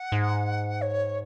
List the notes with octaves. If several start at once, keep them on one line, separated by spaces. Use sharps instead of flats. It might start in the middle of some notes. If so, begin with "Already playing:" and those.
Already playing: F#5
G#2
C#5